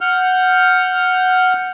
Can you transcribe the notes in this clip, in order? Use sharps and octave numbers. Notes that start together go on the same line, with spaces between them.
F#5 F6 G6